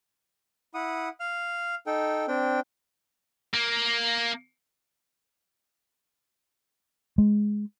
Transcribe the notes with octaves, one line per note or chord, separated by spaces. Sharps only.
E4 F#5 D#6
F5 F6
D#4 A4 G5
C4 D4 G5
A#3
G#3